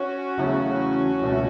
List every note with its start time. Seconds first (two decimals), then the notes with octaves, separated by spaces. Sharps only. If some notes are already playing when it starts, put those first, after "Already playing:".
Already playing: C#4 F#4
0.37 E2 C#3 F#3 A3
1.21 C#2 B2 A3